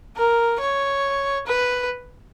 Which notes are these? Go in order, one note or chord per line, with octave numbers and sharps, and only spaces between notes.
A#4
C#5
B4